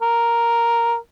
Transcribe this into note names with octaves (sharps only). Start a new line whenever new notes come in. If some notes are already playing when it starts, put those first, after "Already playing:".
A#4